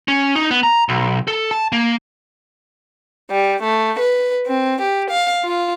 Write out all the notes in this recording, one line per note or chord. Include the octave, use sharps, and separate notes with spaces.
C#4
D#4
B3
A#5
B1
A4
A5
A#3
G3
A3
B4
C4
G4
F5
F4